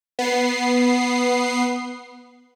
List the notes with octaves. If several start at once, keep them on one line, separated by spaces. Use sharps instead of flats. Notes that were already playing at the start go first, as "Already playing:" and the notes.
B3 C7